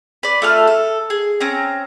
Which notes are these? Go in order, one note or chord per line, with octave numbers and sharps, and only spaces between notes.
B4 D5
A3 F4 A4 F6
A4
G#4
C4 C#4 A#5